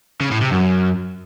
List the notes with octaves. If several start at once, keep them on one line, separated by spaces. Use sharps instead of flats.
C#3
A2
C3
F#2